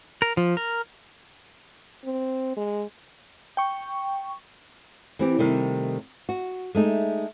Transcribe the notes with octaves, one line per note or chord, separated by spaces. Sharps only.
A#4
F3
A#4
C4
G#3
G5 C#6
E3 C4 G4
C3 D#3 G3 A3
F#4
G#3 A3 D#4